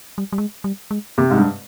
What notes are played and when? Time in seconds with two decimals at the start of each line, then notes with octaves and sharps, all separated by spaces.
0.18 G3
0.33 G3
0.38 G#3
0.64 G3
0.91 G#3
1.18 C3 A#3
1.30 G#2
1.37 G2 G3